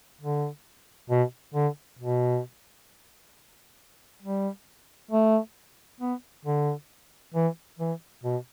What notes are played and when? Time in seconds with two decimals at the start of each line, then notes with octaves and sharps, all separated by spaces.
0.21 D3
1.10 B2
1.54 D3
1.99 B2
4.22 G3
5.11 A3
6.00 B3
6.45 D3
7.34 E3
7.79 E3
8.23 B2